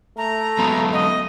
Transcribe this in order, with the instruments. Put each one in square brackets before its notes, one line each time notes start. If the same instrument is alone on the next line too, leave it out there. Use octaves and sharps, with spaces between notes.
[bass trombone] A3 [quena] A#5
[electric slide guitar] F#3 G#3 B3
[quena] D#5